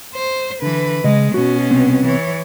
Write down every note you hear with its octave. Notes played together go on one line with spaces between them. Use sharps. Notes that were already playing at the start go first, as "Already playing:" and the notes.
C5
D3 E3 B4
C#3 G#3 D#5
B2 C#4 F#4
C2 B3 C4
E3 C#5